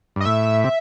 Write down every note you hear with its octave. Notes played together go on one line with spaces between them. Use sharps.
G2
D#5
A2 E5
C3